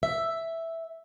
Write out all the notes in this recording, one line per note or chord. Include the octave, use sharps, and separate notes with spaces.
E5